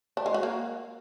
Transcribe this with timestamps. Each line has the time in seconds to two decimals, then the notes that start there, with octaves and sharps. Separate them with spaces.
0.17 D4
0.26 G#3
0.34 F#4
0.43 A#3